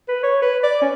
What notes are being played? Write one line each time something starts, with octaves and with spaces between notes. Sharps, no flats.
B4
C#5
B4
D5
C#4